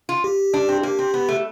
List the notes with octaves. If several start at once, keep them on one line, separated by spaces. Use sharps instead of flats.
F4
G4
D4
C4
A#3 G4
C4
B3
A3